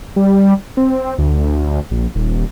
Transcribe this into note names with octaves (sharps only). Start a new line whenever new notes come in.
G3
C4
D2
A#1
D#1